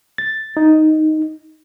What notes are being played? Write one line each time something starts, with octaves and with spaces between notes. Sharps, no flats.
A6
D#4